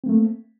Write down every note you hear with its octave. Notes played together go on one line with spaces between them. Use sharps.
A3 A#3 C4